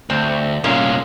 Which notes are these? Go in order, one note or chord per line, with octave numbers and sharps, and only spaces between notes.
D2 C4
C2 A#2 G#3 A#3 C#4